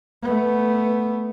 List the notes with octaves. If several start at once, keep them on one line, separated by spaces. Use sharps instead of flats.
A3 B3